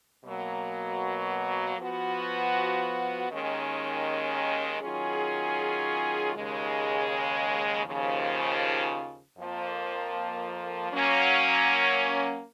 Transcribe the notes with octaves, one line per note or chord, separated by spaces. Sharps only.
B2 F#3 A#3
F3 B3 F#4
D#2 D#3 G#3 C#4
D#3 F#3 C#4 F4 G#4
D#2 C#3 G#3
D#2 C#3 F3
F2 F3 A#3
F#3 A#3 C#4